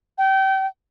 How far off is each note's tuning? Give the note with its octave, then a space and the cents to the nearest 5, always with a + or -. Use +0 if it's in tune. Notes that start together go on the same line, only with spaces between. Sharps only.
G5 -30